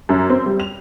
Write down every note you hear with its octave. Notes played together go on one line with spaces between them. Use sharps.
F#2
C4
G3
F7